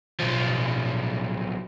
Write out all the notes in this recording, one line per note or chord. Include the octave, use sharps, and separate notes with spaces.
B1 F3